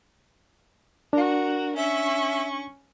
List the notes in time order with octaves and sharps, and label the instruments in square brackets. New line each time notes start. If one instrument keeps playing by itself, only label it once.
[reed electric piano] D4 [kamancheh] F#4 A#4
[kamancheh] C#4 C#6 [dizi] E5